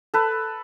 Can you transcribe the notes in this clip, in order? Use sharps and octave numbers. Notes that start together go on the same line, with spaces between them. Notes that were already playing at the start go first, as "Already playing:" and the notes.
A4 B4